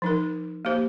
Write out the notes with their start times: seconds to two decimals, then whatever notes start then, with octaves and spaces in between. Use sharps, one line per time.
0.02 F3 D#4 A#4
0.65 A#3 G4 C5